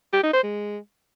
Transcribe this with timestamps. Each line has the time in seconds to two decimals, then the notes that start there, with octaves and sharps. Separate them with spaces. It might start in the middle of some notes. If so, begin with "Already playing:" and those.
0.13 G4
0.23 D#4
0.33 C5
0.43 G#3